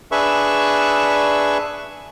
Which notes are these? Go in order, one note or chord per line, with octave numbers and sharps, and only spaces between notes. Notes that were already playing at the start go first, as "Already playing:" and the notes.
D4 G#4 B4 E5 C#6